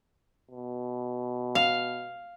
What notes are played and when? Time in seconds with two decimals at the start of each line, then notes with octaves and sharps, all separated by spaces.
0.51 B2
1.55 F5